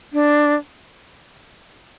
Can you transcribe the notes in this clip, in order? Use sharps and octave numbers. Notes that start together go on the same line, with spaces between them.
D4